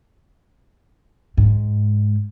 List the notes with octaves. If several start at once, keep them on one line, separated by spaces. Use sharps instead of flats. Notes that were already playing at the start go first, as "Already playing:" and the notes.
G#2